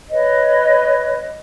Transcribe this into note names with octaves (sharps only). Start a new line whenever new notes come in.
B4 C#5 D#5